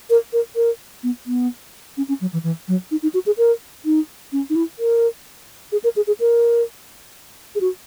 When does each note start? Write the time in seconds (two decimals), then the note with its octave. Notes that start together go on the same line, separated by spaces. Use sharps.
0.10 A#4
0.33 A#4
0.56 A#4
1.03 B3
1.26 B3
1.97 C#4
2.08 C#4
2.21 F#3
2.33 E3
2.43 E3
2.68 F#3
2.91 D#4
3.03 D#4
3.14 F#4
3.26 G#4
3.38 A#4
3.85 D#4
4.32 C#4
4.50 D#4
4.55 E4
4.79 A#4
5.72 G#4
5.84 A#4
5.96 G#4
6.07 G#4
6.20 A#4
7.55 G#4
7.61 F#4